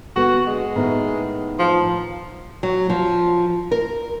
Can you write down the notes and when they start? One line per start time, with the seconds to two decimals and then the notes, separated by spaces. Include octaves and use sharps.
0.16 D3 B3 F#4
0.46 G#3
0.76 A2 D#3 B3
1.59 F3
2.63 F#3
2.90 F3
3.71 A#4